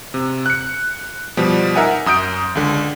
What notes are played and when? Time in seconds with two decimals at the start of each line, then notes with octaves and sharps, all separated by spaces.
0.14 C3
0.46 F#6 C#7
1.37 B2 F3 G3
1.75 D#4 A#4 E5 F#5 G#5
2.06 F#2 D#6 G6 D7
2.55 C#2 D3